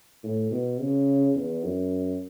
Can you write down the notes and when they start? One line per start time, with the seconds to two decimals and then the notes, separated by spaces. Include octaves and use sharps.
0.23 A2
0.51 B2
0.79 C#3
1.35 E2
1.63 F#2